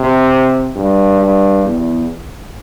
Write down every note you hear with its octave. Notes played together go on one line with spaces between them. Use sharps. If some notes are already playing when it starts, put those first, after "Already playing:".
Already playing: C3
G2
G2
E2